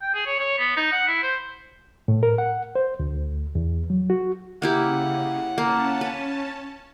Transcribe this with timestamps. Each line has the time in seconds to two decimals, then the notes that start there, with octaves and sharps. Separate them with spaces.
0.02 G5
0.14 G#4
0.26 C#5
0.39 C#5
0.58 B3
0.77 D#4
0.92 F#5
1.08 E4
1.22 C5
2.08 A2
2.23 A#4
2.38 F#5
2.75 C5
3.00 D2
3.55 E2
3.90 F#3
4.10 F#4
4.62 C#3 A#3 E4 G4 F#5
5.58 A#3 C#4 A5
6.01 B4